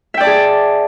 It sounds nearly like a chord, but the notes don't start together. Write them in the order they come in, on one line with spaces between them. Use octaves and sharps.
E5 G5 D5 A5 G#4